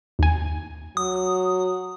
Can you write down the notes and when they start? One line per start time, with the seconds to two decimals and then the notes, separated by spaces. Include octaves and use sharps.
0.19 D#2 G#5
0.97 F#3 D#6